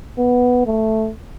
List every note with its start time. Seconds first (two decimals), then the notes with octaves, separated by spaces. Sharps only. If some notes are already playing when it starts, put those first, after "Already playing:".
0.18 B3
0.67 A3